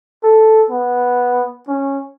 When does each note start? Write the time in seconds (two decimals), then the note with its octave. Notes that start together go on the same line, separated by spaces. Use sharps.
0.23 A4
0.70 B3
1.68 C#4